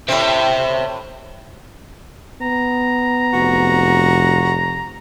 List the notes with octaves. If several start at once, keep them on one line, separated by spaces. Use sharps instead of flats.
A2 C4 C5 E5 G5
B3 A#5
F1 F#4